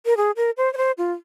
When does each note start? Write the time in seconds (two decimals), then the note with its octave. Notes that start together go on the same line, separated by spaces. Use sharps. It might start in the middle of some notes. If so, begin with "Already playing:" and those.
0.06 A#4
0.17 G#4
0.36 A#4
0.57 C5
0.73 C#5
0.77 C5
0.98 F4